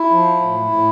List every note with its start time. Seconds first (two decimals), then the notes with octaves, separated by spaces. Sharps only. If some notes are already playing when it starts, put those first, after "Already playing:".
Already playing: E4
0.10 F3
0.41 A2
0.72 A2